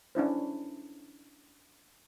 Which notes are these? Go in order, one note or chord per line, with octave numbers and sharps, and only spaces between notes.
C#4 D4 E4 C5